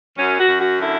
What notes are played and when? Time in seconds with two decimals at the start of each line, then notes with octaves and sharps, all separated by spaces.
0.17 F#2 C#4
0.38 F#4
0.48 F#2
0.59 F#4
0.81 D3 E4